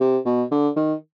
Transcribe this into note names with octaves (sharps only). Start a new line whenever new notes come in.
C3
B2
D3
D#3